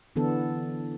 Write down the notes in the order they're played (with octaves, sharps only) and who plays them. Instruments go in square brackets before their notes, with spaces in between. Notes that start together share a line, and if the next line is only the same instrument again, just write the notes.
[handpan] D3 E3 B3 D4 A4